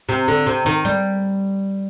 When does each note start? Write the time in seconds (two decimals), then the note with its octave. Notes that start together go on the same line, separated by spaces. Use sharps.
0.09 C3
0.28 D3
0.46 C3
0.66 D#3
0.85 G3